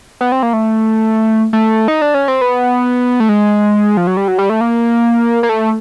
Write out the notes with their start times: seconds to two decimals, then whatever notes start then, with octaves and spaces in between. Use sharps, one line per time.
0.21 B3
0.32 C4
0.43 A#3
0.53 A3
1.53 A3
1.88 D#4
2.01 D4
2.14 C#4
2.28 C4
2.41 B3
3.20 A3
3.29 G#3
3.97 F3
4.07 F#3
4.17 G3
4.28 F#3
4.38 G3
4.49 A3
4.61 A#3
5.43 A#3
5.49 A3